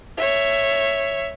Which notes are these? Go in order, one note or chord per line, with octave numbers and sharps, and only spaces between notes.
C#5 E5